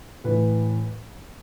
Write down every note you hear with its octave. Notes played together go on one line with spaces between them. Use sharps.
A2 E3 B4